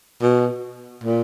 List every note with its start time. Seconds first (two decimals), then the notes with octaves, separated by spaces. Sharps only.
0.22 B2
1.04 A#2